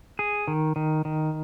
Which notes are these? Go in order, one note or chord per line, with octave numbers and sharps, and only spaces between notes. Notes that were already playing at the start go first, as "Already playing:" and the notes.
G#4
D#3
D#3
D#3